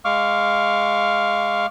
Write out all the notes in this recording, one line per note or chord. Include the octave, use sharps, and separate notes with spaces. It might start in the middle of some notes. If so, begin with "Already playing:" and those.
G#3 F5 C#6 D6 F6